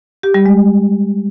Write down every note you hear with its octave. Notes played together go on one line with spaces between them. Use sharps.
G4
G3
G#3